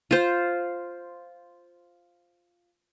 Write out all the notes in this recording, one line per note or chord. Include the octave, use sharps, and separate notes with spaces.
F4 C5